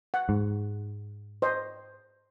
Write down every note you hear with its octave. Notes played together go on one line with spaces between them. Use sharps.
F#5
G#2
C5 D#5